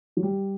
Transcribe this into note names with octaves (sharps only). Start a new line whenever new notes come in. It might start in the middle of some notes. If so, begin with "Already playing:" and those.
F#3
G3